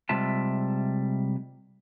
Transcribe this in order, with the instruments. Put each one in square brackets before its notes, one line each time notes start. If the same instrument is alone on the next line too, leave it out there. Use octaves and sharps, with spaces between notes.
[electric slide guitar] C3 G3 G#3 F4 E5 A5